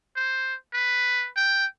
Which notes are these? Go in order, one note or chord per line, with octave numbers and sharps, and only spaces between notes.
C5
B4
G5